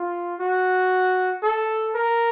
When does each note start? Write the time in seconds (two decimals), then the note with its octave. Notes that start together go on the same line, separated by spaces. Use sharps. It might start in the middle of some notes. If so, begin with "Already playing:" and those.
Already playing: F4
0.40 F#4
1.43 A4
1.95 A#4